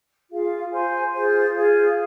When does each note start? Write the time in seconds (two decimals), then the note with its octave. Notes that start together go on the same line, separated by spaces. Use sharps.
0.30 F4 G#4 F5
0.71 C5 G#5 C6
1.12 F4 G#4 C5
1.54 F4 G#4 F5